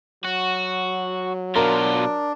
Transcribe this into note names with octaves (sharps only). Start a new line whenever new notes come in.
F#3 F#4
B2 D4 F4 A#4